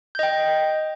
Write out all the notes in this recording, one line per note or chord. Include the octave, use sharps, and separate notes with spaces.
D#5 G5 G6